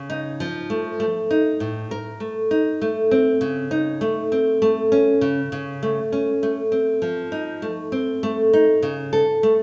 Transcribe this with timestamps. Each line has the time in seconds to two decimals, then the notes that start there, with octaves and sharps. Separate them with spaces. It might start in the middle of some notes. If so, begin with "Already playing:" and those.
Already playing: C#3
0.10 D#4
0.40 F3
0.70 A3
1.00 A3
1.31 D#4
1.60 A2
1.91 A#4
2.20 A3
2.51 D#4
2.82 A3
3.11 C4
3.41 C#3
3.71 D#4
4.01 A3
4.32 C4
4.62 A3
4.92 C#4
5.21 C#3
5.52 C#3
5.83 A3
6.12 C#4
6.43 A3
6.72 C4
7.02 F3
7.32 D#4
7.62 A3
7.92 C4
8.23 A3
8.53 D#4
8.82 C#3
9.13 A4
9.43 A3